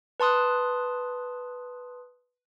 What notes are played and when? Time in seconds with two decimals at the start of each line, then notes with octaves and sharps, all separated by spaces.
0.20 B4 A5 C6 D#6 F#6